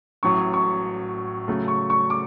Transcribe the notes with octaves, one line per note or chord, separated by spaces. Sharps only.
A1 A2 F#3 C#6
C#6
C#3 F#3 A3
C#6
C#6
D6